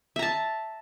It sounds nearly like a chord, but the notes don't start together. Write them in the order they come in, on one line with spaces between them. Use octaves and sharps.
E5 A#5 A5